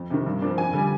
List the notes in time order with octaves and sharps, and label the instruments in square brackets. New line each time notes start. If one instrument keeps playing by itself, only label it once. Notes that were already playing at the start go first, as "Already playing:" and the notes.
Already playing: [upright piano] F2
C3 D#3
G2
F3 A#3 D4
F2 G#5
D3 G3